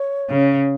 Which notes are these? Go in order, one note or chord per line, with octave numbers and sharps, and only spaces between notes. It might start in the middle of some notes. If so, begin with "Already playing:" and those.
Already playing: C#5
C#3